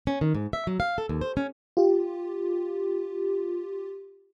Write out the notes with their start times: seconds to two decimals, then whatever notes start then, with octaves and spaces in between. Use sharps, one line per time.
0.07 C#4
0.21 D#3
0.35 G#2
0.53 E5
0.67 F#3
0.80 F5
0.98 A4
1.09 D#2
1.21 C5
1.37 C#4
1.77 F4 G4